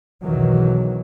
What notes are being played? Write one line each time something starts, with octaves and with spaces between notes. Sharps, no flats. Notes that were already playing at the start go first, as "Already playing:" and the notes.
B1 E2 B2 D#3 E3 F#3